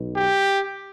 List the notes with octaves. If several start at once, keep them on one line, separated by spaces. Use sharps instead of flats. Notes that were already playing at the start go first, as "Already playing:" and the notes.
Already playing: B1 B2
G4